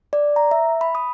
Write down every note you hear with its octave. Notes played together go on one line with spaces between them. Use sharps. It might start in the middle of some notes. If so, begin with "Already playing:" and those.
D5
A#5
E5
B5
D#6